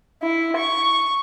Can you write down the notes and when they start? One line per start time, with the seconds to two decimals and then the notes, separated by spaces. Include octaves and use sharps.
0.23 E4
0.58 C#6